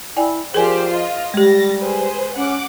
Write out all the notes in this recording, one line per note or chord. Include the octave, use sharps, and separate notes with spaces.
E4 D5 G5 G#5
F3 G4 G#4 A#4 C5 D5 G#5
F4 D#5
G3 G#3 G4 A6 A#6
G#4 B4 C5
C#4 F#5 D6